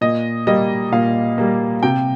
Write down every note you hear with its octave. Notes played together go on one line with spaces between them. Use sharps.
A#2 D#5
G3 A#3 D#5
A#2 F5
G3 A#3
C3 G5